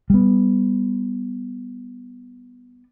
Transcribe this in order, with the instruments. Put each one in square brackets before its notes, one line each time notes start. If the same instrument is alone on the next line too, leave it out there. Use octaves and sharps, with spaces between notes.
[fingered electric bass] G3 B3